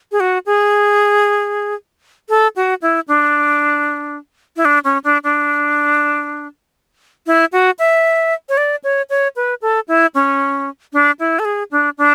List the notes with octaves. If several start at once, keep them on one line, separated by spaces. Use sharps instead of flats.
G#4
F#4
G#4
A4
F#4
E4
D4
E4
D4
C#4
D4
D4
E4
F#4
E5
C#5
D5
C#5
C#5
B4
A4
E4
C#4
D4
E4
A4
G#4
D4
D4